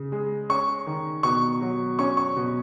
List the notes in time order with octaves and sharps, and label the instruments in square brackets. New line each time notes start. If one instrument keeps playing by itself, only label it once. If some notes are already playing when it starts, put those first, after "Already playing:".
Already playing: [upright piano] C#3
G#3
C#4 C#6
D#3
B2 C#6
F#3
C#4 C#6
C#6
B2